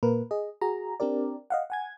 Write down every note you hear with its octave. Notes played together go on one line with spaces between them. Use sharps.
A#2 A#3 A#4 B4
G#4 D#5
F#4 G#4 A#5
C4 D4 G4 A#4 D5
D#5 F5 F#5
F#5 G#5 G#6